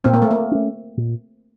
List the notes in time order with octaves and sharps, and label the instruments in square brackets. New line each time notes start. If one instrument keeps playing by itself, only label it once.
[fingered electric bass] A#2 [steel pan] C4
[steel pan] A#3
A3
A#3
[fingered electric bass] A3 C#4
A#2